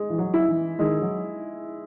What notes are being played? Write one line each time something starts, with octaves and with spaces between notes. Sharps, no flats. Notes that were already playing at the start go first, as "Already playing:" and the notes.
Already playing: G#3
E3
F#3
E4
E3
D#3 G#3
F#3